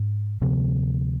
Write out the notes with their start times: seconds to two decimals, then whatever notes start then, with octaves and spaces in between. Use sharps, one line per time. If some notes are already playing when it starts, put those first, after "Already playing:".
Already playing: G#2
0.41 D2 C3 F3 B3